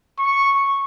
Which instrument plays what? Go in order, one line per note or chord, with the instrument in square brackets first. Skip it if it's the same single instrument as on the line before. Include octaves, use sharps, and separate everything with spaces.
[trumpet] C#6